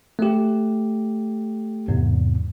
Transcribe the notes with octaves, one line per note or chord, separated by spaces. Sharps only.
A3 G4
E2 G#2 C3